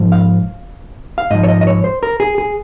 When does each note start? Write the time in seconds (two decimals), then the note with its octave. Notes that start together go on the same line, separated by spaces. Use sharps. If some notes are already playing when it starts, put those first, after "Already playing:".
Already playing: G#2 F3
0.12 F5
1.18 F5
1.30 G#2 F3 D#5
1.43 C#5
1.48 D#5
1.61 D#5
1.67 C#5
1.84 C5
2.03 A#4
2.20 G#4
2.38 G#4